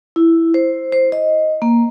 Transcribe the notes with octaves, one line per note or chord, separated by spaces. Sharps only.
E4
C5
C5
D#5
A#3